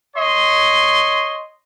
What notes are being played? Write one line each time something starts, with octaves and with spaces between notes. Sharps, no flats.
C#5 D#5 C6